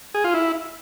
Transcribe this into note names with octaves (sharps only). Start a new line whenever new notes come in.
G#4
F4
E4